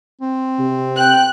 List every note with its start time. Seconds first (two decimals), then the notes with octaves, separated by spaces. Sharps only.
0.22 C4
0.59 C3
0.98 G5 F#6